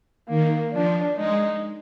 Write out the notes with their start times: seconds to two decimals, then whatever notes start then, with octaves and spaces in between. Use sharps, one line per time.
0.29 D#3 A#3
0.72 F3 D4
1.16 G#3 D#4